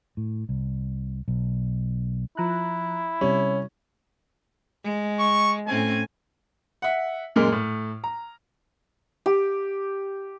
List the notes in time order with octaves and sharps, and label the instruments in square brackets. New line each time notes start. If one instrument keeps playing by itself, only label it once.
[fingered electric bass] A2
C2
B1
[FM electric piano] F3 A#5 F#6 [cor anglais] E4
[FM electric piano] C3 G3 [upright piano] C#4
[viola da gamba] G#3
[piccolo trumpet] C#6
[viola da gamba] A2 C4 C#4 [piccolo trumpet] G#5
[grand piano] E5 F#5
F#2 A#2 G#3 A#3 A#4 F6
A2
A#5
[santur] G4